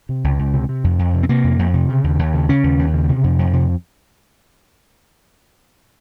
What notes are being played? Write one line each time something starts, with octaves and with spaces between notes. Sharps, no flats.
C3
C#2
C#2
C3
C3
F2
F2
C3
C4
C3 A#3
F2
F2
C3
C#3
D#2
D#2
C#3
C#3 C#4
D#2
D#2
C#3
C3
F2
F2
C3